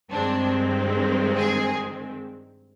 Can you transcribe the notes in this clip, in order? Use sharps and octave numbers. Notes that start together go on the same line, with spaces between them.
G2 D#3 G#3 C4 D4
G#4